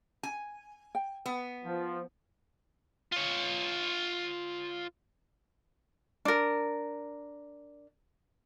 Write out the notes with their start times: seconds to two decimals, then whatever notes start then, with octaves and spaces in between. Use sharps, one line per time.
0.23 G#5
0.95 G5
1.26 B3
1.64 F3
3.12 F4 C#5
6.25 D4 A#4